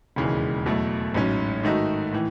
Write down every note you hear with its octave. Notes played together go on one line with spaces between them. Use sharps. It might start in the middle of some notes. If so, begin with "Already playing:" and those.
E1 D#2 C#3 E3 G#3
E2 B2 F#3 A3
A1 G#2 F#3 C#4
G#2 D#3 A3 D#4 F#4
A2 E3